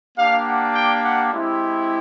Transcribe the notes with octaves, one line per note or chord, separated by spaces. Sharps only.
A#3 D4 G4 F5
F#5
G5
F#5
G#3 C4 E4 G4